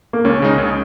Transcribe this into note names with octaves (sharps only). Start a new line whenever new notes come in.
A#3
C#2 C#4
C#3 G#3 D#4
C#2